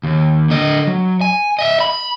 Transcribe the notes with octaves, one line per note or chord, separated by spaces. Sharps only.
D#2
D3 D#5
F#3
G#5
D#5 E5
B5